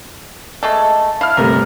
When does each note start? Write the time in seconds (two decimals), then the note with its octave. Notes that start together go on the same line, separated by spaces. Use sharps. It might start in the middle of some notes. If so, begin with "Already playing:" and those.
0.63 G#3 A3 A4
1.21 E4 F5 F6
1.37 G1 C3 A3 A#4